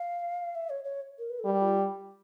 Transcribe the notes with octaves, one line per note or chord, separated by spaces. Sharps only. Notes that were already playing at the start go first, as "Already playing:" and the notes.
Already playing: F5
E5
C#5
C#5
A#4
B4
A4
G3 A#4
F4